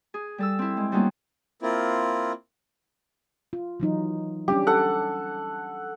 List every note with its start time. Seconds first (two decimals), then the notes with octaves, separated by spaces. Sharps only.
0.14 G#4
0.38 G3 A4 E6
0.59 C4 E4
0.77 G#3
0.92 G3 A#3 B3 C#4 D#4 F4
1.62 A#3 C4 E4 F4
3.53 F4
3.80 E3 F#3 D#4
4.48 G3 C#4 D4 G4
4.67 A4 F#5